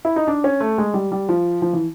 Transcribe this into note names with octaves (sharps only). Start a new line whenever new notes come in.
E4
D#4
D4
C#4
A3
G#3
G3
G3
F3
F3
E3